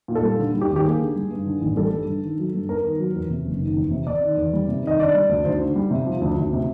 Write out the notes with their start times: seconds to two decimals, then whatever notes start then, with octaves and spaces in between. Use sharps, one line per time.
0.08 A#2
0.15 A4
0.23 G3
0.39 D3
0.54 G3
0.61 G4
0.69 D#2
0.76 G4
0.85 A#3 G#4
1.00 D3
1.15 G3
1.31 G2
1.46 D3
1.61 A1
1.76 G3 A4
1.92 G2
2.07 D3
2.23 D#3
2.39 F#3
2.54 G2
2.69 B3 A#4
2.84 D#3
2.99 F#3
3.15 E2
3.30 C3
3.45 F#1
3.60 D#3
3.76 E2
3.91 C3
4.06 C3 D5
4.23 D#3
4.37 E2
4.53 G3
4.69 C3
4.83 D#3 D#5
4.99 D3 D5
5.14 G3
5.29 D2
5.45 D2 C5
5.60 D3
5.76 G3
5.91 C3
6.06 F3
6.21 D2
6.37 D2
6.53 C3